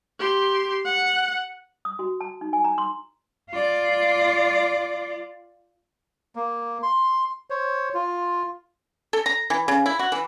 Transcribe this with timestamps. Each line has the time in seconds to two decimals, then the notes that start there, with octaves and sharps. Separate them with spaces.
0.19 G4 C6
0.85 F#5
1.85 D#6
1.99 F#4
2.21 A5
2.41 D#4
2.53 G#5
2.64 A#5
2.78 C6
3.50 F4 D5
6.36 A#3
6.83 C6
7.50 C5 C#5
7.94 F4
9.13 A4
9.26 A#5
9.50 E3
9.68 C#3
9.86 E4
9.99 F#4
10.12 E3